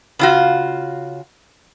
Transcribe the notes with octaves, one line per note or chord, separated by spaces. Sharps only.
C#3 F4 F#4